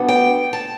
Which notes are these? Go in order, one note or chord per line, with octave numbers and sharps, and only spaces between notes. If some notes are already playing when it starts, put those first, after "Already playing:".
Already playing: B2 G3 B3 D4
G5
A5